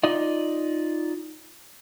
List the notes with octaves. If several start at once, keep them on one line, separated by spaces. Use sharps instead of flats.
D#4 F4 D5 D#5